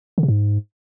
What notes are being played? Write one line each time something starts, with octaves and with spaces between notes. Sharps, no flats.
D3
C3
G#2